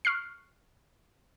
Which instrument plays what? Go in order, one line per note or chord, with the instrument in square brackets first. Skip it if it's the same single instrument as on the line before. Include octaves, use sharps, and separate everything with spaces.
[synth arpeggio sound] C#6 F6 F#6 C7